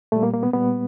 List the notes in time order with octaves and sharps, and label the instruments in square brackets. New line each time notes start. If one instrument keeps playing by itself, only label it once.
[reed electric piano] A#2 G3 A3
A#3
A#3
B3
A#2 G3 B3